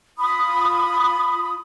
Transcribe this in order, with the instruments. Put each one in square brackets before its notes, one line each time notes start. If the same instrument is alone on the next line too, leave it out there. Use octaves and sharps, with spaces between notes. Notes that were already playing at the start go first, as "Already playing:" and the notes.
[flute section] F4 B5 D#6